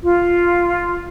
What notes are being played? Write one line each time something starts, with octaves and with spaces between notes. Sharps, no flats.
F4